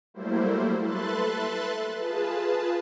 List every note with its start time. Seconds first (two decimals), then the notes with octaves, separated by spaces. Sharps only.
0.14 F#3 G3 A3 A#3 E4 C5
0.83 A4 B4 E5 C6 F#6 A6
1.98 F4 G#4 B4 A5